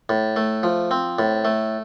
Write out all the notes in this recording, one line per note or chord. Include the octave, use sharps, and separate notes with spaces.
A2
A3
F3
C4
A2
A3